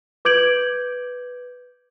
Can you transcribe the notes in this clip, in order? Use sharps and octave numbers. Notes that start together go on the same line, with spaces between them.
B4 D6 G6 G#6 D7 F#7